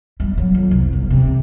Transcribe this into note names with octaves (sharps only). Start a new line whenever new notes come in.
G3
F#3
F2
C2
G1
C3